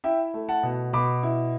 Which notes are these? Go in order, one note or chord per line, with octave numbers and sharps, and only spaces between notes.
E4 E5 G5
A3
F#5 A5
B2
B2 B5 D6
E4